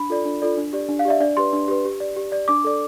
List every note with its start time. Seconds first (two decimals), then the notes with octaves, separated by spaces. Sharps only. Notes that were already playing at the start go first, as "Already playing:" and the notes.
Already playing: D4 B5
0.10 F4 A4 D5
0.25 D4
0.42 F4 A4 D5
0.57 D4
0.73 G4 D5
0.88 D4
0.99 F5
1.05 G4 D5 E5
1.20 D4 D5
1.37 G4 B4 C6
1.53 D4
1.68 G4 B4
1.85 G4
2.00 D5
2.16 G4
2.32 D5
2.48 D4 D6
2.64 A4 D5